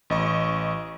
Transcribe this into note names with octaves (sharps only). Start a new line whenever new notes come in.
A1 D#5 C#6